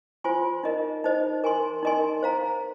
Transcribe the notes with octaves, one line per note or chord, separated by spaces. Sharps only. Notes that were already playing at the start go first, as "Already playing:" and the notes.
F4 C5 G#5 C6
D#4 A#4 D#5
D#4 C5 D#5
A#4 G#5 C6
D#4 A#4 D#5 G#5 C6
C5 F5 A#5